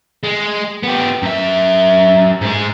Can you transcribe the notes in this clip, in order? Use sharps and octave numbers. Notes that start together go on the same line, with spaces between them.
G#3
B3 G4
F#2 E5
G#2 G#3